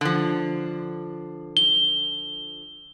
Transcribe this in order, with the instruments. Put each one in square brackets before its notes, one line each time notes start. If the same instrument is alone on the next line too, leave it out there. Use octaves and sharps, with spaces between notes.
[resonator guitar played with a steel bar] D3 F3
[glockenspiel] G7